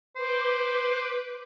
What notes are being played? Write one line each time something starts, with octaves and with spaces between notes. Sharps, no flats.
B4 C5 D6 G6